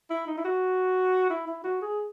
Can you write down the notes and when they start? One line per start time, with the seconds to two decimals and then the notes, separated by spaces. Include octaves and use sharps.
0.10 E4
0.27 D#4
0.37 E4
0.45 F#4
1.30 E4
1.47 E4
1.64 F#4
1.82 G#4